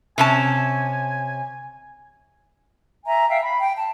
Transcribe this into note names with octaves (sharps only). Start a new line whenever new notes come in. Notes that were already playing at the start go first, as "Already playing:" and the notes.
C3 C#4 G#5 A5
E5 G#5 A#5
E5 F5 G5
B5
G5
A5